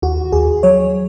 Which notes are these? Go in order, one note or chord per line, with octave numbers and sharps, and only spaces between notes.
D#2 F#4
D#2 G#4
F#3 C#5